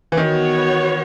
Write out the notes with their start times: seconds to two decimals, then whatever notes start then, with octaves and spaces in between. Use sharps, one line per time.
0.12 E3
0.17 D#3 B3 F#4 C#5